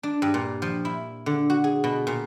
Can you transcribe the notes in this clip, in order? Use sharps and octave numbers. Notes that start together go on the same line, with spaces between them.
D4
G2
A#2
F3
E4
D3
F#4
G#4
B2
A#2